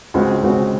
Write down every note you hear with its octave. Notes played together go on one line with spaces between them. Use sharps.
C#2 C#3 G#3 C4 F#4
C#2 C#3 G#3 C4 F#4